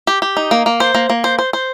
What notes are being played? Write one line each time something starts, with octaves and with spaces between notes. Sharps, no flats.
G4
G4
D#4
A#3
A#3
C5
A#3
A#3
C5
C5
C5